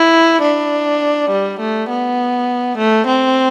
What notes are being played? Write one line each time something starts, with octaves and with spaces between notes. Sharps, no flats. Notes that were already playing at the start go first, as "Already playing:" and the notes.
Already playing: E4
D4
G3
A3
B3
A3
C4